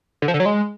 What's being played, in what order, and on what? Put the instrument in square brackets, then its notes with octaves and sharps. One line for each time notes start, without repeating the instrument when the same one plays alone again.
[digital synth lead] D3
F3
D3
F#3
G#3